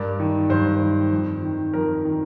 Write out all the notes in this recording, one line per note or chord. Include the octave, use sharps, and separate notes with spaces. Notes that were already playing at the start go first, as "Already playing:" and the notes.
Already playing: G2 A#4 D5
D#3
G2 C5
D#3
F2
D#3
F2 A#4
D#3